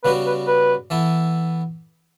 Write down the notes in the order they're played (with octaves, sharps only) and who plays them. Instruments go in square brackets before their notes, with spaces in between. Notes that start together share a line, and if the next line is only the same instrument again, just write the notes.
[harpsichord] C#3 G3 B3 F#4 [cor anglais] B4
[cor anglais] B4
B4
[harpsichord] E3 B3 E4 A4